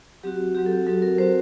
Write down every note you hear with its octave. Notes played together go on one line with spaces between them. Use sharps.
F#3 C4 F#4 G4
F#3 C4 F#4 G4
A4
G4
F#3 C4 F#4 A4
A#4
F#3 C4 F#4 C5